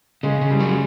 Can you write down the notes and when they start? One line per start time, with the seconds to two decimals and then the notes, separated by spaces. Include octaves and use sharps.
0.23 C#3 G#3
0.41 C#3
0.51 G3
0.59 F#3